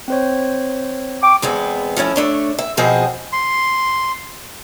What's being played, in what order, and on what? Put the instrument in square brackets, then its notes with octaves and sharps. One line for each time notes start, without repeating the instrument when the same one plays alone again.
[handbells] C4 C5 C#5
[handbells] G5 C#6 [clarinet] D6
[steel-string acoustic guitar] E2 G#3 B3 C4
F3 A3 C#4 E4
A3 D4 C#5
E5
B2 F3 C4 F#4 G#4 D#5
[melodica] C6